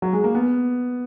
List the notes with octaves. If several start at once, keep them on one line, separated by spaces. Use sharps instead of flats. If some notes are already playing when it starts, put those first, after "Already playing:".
F#3
G#3
A#3
B3